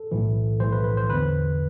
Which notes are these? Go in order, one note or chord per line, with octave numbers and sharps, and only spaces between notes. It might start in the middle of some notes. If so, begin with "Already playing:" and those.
Already playing: A4
B1 A2 E3
B1 A2 E3 C5
B4
B4
C5
E2 D3 B4